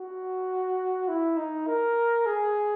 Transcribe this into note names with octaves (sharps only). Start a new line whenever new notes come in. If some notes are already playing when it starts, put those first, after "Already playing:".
Already playing: F#4
E4
D#4
A#4
G#4